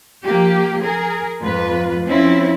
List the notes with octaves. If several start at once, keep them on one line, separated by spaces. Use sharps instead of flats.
F3 A#3 G4
G#4 A#4
F2 G#2 F4 B4
F3 C4 C#4 E4